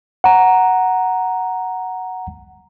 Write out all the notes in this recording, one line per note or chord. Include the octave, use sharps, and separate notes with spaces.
F#5 A#5